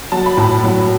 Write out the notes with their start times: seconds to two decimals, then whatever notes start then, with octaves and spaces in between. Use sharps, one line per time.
0.12 F#3 A5
0.26 B5
0.37 A2 A5
0.64 F#3